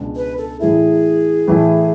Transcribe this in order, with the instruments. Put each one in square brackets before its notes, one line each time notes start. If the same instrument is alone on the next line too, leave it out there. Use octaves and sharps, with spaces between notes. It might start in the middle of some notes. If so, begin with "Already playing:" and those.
Already playing: [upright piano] C#2 B2 G#3 D4
[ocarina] B4
A4
[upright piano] A2 E3 A3 E4 [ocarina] G#4
[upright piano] A2 E3 A3 E4